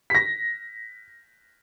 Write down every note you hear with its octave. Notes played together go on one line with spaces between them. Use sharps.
A#6 B6